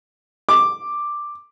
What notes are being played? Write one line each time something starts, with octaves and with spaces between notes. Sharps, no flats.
D6